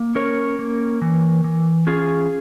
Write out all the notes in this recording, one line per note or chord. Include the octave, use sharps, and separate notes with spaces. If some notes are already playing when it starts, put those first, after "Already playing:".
Already playing: A#3
C#4 A#4 C#5
A#3
E3
E3
C#4 F4 G#4